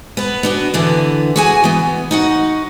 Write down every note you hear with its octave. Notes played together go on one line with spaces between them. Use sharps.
B3 B4
B3 D4 F#4
D3 E3 B3
F#4 G#4 G#5
E3 B3
D#4 F#4 F#5